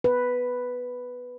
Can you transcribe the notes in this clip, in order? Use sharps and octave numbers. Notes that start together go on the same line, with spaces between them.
B4